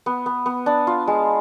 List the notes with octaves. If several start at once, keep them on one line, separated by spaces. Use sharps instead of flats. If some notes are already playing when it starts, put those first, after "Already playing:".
B3
B3
B3
D4
F4
G#3